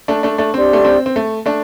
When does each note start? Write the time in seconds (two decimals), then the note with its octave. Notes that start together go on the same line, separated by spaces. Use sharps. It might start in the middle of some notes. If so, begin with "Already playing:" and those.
0.08 A3 D4
0.23 A3 D4
0.38 A3 D4
0.54 C4 D4 G4 D5 C6
0.73 A3
0.85 C4
1.06 C4
1.16 A3
1.46 A3 D4